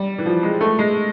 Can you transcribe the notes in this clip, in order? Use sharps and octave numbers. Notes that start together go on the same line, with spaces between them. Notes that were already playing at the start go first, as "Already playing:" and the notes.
Already playing: G3
E3
F3
G#3
A3
G#3